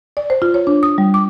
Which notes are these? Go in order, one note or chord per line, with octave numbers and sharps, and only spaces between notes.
D5
C5
F4
C#5
D4
D#6
G3
D6